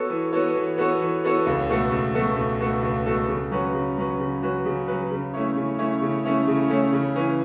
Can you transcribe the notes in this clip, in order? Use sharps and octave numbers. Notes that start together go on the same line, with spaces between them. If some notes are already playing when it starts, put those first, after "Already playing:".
Already playing: B3 F#4 A4 C#5
E3
B3 F#4 A4 C#5
E3
B3 F#4 A4 C#5
E3
B3 F#4 A4 C#5
C#2
B2 A3 F#4 A4
C#2
B2 A3 F#4 A4
C#2
B2 A3 F#4 A4
C#2
B2 A3 F#4 A4
C#3
F#3 C#4 F#4 B4
C#3
F#3 C#4 F#4 B4
C#3
F#3 C#4 F#4 B4
C#3
F#3 C#4 F#4 B4
C#3
A3 C#4 E4 C#5
C#3
A3 C#4 E4 C#5
C#3
A3 C#4 E4 C#5
C#3
A3 C#4 E4 C#5
C#3
E3 C#4